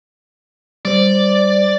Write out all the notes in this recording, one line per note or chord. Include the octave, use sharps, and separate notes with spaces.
G3 C5 D5